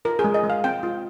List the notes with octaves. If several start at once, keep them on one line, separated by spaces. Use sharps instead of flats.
F4 A#4
G#4
G#3
D#5
G#3
F5
C4 G5
F4